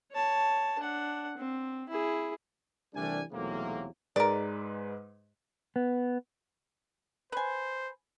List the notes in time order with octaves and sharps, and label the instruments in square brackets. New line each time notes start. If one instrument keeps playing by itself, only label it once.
[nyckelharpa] C#5 A5
D4 F#5
C4
E4 G#4
[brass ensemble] C2 E3 G3 A3 D4 G#5
B1 E2 C3 F#3 A3 A#3
[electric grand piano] G#2 G#3 B4 [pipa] A#4 D5
[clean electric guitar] B3
[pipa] B4 G#5 [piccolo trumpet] C5